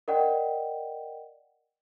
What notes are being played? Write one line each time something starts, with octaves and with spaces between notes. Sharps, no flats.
A#4 D5 D#5 F#5 G5